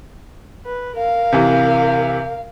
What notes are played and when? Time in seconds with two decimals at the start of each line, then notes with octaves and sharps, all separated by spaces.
0.65 B4
0.97 A#4 F5
1.33 C3 E3